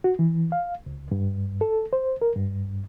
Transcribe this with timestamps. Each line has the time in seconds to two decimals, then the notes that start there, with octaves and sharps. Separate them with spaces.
0.04 F#4
0.19 E3
0.52 F5
0.86 C#2
1.11 G2
1.61 A4
1.93 C5
2.22 A#4
2.36 G2